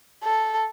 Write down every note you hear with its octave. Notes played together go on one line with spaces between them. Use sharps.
A4